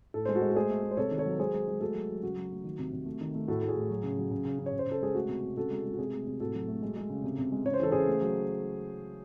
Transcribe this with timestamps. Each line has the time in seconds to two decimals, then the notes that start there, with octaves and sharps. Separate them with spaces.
0.14 A2 A4
0.25 G#3 C5
0.35 F#4 A4
0.42 G#3
0.51 A4
0.56 A3 G#4 C5
0.70 A3
0.83 A3
0.91 C5
0.97 C3 A4 C#5
1.11 D#3
1.18 A4 C#5
1.26 F#3
1.39 G#3 G#4 C5
1.54 G#3
1.68 G#3
1.81 A3 F#4 A4
1.94 F#3
2.10 F#3
2.23 C#3 F#4
2.36 F#3
2.51 A3
2.64 D#3
2.79 C3
2.93 C3
3.06 A3
3.21 D#3
3.35 A3
3.48 A2 F#4 A4
3.63 A2
3.69 G#4
3.76 A2
3.90 F#3
4.03 C#3
4.18 F#3
4.31 C#3
4.45 C#3
4.59 C#3
4.66 C#5
4.73 C#3
4.79 C5
4.87 C#3 A4
5.02 G#3 G#4
5.15 A3 F#4
5.29 C3
5.43 C3
5.57 C#3 F#4 A4
5.71 G#3
5.85 G#3
5.93 F#4
5.99 C3 G#4
6.13 A3
6.27 C3
6.40 A2 F#4 A4
6.55 F#3
6.68 A3
6.82 G#3
6.97 G#3
7.10 C#3
7.23 C3
7.38 C3
7.52 G#3
7.65 C#3 C#5
7.74 C5
7.80 E3 A4
7.91 C#3 G#4 C5
8.08 A3
8.22 F#3